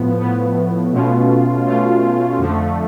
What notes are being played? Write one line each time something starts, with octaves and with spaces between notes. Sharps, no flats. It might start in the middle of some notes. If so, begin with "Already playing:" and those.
Already playing: A2 F3 B3
A2 F3 B3
B2 A3 C#4 F4
B2 A3 C#4 F4
F2 D3 F3 A3